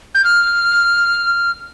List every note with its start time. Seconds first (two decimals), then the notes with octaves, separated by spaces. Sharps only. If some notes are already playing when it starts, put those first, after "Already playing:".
0.15 G6
0.24 F6